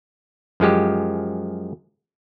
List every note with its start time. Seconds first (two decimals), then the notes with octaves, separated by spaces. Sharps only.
0.60 F#2 F3 G#3 G4